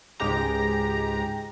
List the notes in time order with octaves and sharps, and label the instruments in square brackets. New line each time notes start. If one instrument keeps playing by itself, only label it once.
[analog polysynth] C#2 G#2 G#3 G4 A#5